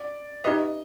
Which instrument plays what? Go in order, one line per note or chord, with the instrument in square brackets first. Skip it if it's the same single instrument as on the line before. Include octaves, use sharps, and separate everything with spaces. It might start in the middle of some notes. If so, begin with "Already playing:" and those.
Already playing: [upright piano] D5
[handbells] D#4 G4 B4 E5 [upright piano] D#5